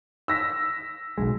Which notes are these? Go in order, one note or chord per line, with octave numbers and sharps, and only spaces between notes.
E6 A#6 B6
B1 E2 G#3